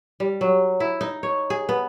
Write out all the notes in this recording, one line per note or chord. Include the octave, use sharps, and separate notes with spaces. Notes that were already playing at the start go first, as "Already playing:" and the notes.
G3
F#3
E4
D#4
C#5
G#4
B3